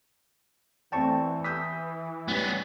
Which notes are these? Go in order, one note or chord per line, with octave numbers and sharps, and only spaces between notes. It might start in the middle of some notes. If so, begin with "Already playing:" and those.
E3 A3 C4 D5 G5 A5 C#6
D#6 E6 G6 B6
G3 B3 C#4